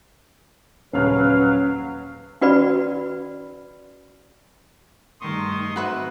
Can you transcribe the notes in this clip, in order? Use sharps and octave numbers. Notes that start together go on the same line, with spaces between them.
D#1 C#3 F#3 C#4 B4 F5 F6
C#4 F#4 B4 D5 B5
G2 D#3 G#3 A3 D#4 C6 C#6 D#6
G#2 C4 D#4 F#4 B4 E5